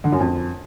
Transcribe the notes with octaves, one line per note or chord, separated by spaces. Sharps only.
D3
F#2
F2